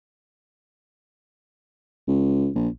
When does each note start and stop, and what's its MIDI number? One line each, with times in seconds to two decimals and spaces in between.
2.07 2.50 37
2.55 2.68 34